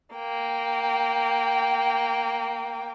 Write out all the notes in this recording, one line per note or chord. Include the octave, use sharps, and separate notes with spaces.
A#3 G5